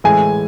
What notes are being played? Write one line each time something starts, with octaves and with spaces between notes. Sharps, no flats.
A2 E3 G#3 G#5